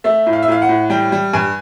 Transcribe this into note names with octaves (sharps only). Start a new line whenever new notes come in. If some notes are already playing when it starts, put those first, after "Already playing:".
A3 E5
A2
F5
E5
A2 F5
F#5
A2
G3 G5
G3
G2 G#5